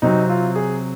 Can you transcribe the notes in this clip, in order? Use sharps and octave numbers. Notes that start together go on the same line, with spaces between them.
C3 F#3 C4 D#4
F4
G#4